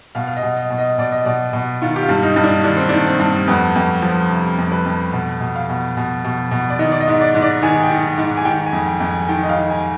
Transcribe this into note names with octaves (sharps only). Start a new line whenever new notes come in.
B2 F5
F5
D#5
B2
D#5
B2
D#5
B2 D5
D#5
B2 D5
B2
D#3 F4
G4
F4
G2
D#4
G2
D4
D#3 D4
C4
D4
D#3
C4
G2
F2 B3
F2
F3
C3
F2
B4
F2
B2
B2
F5
B2
B2
B2
B2
D5
D#3 D#5
D5
D#5
G#2
D5
G#2
D5
D#3 G#5
G5
D#3
G#2
G#5
D#3 G5
G#5
F2
G5
F2
G#5
D#3 G5
D#5
F5
D#3
G#5